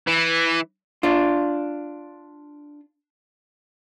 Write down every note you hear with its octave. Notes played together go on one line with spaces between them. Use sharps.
E3
D4 F4